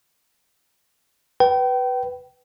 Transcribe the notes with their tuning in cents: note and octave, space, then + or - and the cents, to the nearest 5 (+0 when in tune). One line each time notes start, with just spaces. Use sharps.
B4 +0 G5 -30